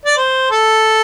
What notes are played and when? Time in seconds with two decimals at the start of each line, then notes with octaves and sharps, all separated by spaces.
0.05 D5
0.17 C5
0.51 A4